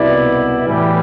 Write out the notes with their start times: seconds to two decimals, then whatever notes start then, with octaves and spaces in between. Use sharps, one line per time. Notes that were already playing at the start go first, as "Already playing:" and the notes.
Already playing: C2 B2 B3 E4 D5
0.65 A2 E3 G3